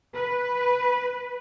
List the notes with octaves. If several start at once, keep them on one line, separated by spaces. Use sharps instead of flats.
B4